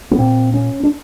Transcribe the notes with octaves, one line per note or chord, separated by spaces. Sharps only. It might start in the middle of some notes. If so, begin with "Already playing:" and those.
B3
A#2 C4
C#4
D4